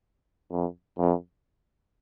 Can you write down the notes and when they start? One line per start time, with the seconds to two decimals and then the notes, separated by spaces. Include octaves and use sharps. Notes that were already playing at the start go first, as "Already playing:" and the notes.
0.51 F2
0.99 F2